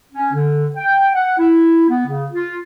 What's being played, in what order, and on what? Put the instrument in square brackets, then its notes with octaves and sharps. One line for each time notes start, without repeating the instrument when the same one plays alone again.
[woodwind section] C#4
D3
G5
F#5
E4
B3
C#3
F4